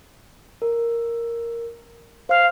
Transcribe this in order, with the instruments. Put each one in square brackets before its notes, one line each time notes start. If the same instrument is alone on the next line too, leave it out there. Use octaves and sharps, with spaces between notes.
[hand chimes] A#4
[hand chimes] C5 F6 [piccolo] F5